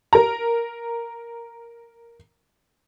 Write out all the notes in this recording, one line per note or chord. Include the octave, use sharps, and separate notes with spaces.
A#4 A#5